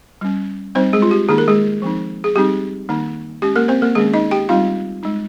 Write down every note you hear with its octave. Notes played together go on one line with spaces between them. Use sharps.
G3 C#4
G3 C4 D#4 C5
G#3 G#4
F4
G4
D#3 A#3 D#4 G#4
A#4
G#3 G#4
F3 C4 D#4
G#4
G3 C4 D#4 G4
D#3 A#3 D#4
G#3 C#4 G4
A#3 A#4
C4 C5
A#3 A#4
D#3 G#3 A#3 C#4 G#4
D#4 D#5
G4 G5
G3 C4 D#4 F4 F5
G#3 D#4